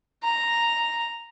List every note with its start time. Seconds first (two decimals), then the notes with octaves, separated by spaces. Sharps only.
0.23 A#5